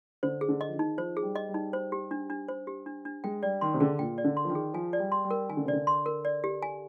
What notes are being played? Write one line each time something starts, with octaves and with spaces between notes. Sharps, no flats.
D3 C5
G#4
D3
D#5
F3
D#3
D#4
F3 C5
G#4
G3
D#5
G3
D#4
C5
G4
D4
D4
C5
G4
D4
D4
G#3 G5
G3 D5
D#3 C6
C3
D3 G#4
A#2 G5
D5
D3
C6
F3
D#3
G#4
F3 G#5
D5
G3
C6
G3
A#4
D#3 G#5
D3
C3
D3 D5
C6
A#4
D5
G4
G#5